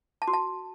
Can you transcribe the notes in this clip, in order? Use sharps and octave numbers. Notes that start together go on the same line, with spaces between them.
A5
F#4
A5